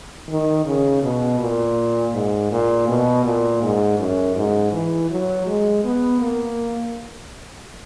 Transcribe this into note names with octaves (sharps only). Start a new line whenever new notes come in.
D#3
C#3
B2
A#2
G#2
A#2
B2
A#2
G#2
F#2
G#2
E3
F#3
G#3
B3
A#3